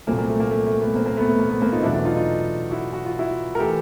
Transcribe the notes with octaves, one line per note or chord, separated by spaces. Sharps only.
C2 A#2 F#3 A3 A#3 C4
A#3
A3
A#3
A3
A3
A3 B3
A#3 C4
A#3 C4
A3 B3
A3
A#3
A3 B3
A#3 C4
D#4 F4
E2 B2 F#3 A3 D4 E4
D4 E4
D#4 F4
D#4 F4
E4 F#4
F#4
F4
E4 F#4
A#4
E3 A3 G4 A4